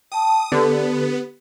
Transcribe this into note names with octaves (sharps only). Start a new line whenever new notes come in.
G5 A5 D#6
D3 B3 G4